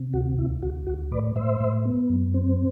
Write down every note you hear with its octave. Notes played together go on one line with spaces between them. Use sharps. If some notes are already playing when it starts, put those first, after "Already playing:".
Already playing: C3
D2 F#4
D2 E4
D2 F#4
D2 F#4
A2 B4 D5
A2 C5 E5
A2
B3
F#2
C4